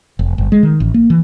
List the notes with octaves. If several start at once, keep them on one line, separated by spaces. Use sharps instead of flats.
F1
G1
G#3
D#3
A1
A#3
E3